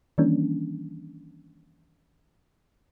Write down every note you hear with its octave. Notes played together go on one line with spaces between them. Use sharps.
D#3 E3 G3 A#3 C#4 D4